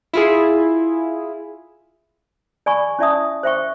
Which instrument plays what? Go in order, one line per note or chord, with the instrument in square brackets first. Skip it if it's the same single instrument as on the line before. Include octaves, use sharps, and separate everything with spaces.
[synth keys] E4 F4 G#4
[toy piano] D5 G#5 B5 C#6
C#4 E4 D5 E5 A5 D#6
C5 E5 G5 C#6